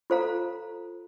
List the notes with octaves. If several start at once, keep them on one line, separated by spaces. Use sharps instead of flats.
F4 A4 C5 F5 A#5